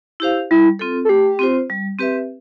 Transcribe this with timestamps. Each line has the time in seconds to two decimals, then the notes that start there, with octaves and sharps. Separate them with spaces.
0.20 E4 G4 C5 F5
0.51 G3 E4
0.79 C4 F4 A4
1.05 A4
1.09 A3 G4
1.39 C4 F4 C5
1.70 G3
1.99 C4 G4 B4 E5